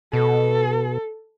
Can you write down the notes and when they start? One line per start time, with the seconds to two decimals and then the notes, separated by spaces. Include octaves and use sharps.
0.13 B2 A4